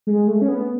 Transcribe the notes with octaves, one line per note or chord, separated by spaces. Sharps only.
G#3
A3
C#4
B3